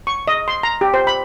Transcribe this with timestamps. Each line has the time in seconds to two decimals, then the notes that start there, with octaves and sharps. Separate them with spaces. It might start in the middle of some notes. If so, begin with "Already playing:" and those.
0.07 C#6
0.27 D#5
0.48 C6
0.63 A#5
0.81 G4
0.94 C5
1.07 B5